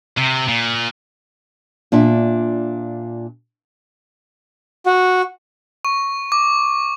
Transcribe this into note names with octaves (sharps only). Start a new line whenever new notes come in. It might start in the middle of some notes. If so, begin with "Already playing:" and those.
C3
A#2
A#2 D4 F4 E5
F#4
C#6
D6